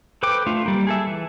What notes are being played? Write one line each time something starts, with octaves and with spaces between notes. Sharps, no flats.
A4 B4 C5 G5 D6
A3 D4 F4
G3 A#3
G#4 A4 E5
E3